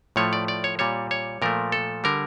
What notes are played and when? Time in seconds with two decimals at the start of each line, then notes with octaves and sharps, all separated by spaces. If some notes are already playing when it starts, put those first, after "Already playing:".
0.16 A2 F3 A3 C#5
0.33 D5
0.48 D5
0.64 C#5
0.79 A#2 G3 C#5
1.11 C#5
1.42 A#2 F3 A3 A#4
1.72 A4
2.04 D3 G3 A#4